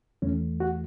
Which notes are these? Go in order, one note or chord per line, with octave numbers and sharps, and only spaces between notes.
E2 E3 A3 C#4
F#4